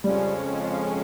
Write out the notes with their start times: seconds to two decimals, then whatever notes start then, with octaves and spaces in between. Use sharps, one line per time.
0.04 F2 C#3 F3 G3 G#3 C#4